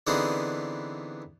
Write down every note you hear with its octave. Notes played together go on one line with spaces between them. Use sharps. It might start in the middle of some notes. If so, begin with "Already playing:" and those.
D3 E3 B3 C4 D#4 G#4